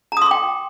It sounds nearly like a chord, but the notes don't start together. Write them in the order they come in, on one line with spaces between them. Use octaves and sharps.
A#5 D#6 C6 D6 G5